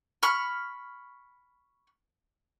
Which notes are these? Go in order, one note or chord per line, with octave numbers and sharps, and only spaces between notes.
B5 C#6 F6